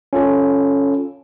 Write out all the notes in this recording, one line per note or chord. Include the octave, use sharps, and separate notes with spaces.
C#4 F4 A4